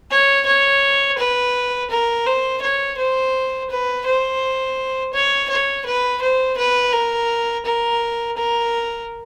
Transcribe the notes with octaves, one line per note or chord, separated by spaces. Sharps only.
C#5
C#5
B4
A#4
C5
C#5
C5
B4
C5
C#5
C#5
B4
C5
B4
A#4
A#4
A#4